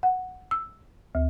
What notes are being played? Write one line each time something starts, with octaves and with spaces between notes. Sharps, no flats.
F#5
E6
D2